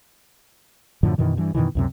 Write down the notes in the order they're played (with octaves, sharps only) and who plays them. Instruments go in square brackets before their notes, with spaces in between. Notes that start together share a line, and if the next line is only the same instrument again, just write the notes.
[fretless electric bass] F#2 A2 D3 F3
F#2 B2 D#3 E3
G2 E3
F#2 B2 D#3 E3
C#2 F#2 C3